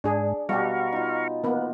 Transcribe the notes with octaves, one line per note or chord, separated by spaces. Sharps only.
G#2 D4 G#4 D5
B2 G3 F#4 G4 F5 A#5 C#6
D#4 F4
A#3 B3 B4